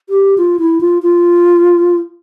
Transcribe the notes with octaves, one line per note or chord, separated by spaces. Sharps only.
G4
F4
E4
F4
F4